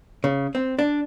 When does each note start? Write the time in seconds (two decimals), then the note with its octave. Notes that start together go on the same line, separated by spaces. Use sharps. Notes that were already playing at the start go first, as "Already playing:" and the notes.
0.24 C#3
0.55 C4
0.79 D4